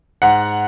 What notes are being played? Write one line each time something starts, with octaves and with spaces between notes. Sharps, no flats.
G#2 F#5